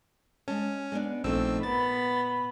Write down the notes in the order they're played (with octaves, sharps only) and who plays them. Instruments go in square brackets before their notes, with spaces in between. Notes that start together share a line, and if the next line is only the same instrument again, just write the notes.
[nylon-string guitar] G#3 A5 [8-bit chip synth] C#4
[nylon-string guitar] G#3 B3 D4
[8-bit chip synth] A#1 C4 E6 [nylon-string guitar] F3 A3 D#4
[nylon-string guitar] A#2 [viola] B3 B5 [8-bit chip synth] A6